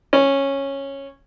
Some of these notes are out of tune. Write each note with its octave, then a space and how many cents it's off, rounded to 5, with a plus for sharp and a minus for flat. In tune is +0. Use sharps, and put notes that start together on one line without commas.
C#4 -10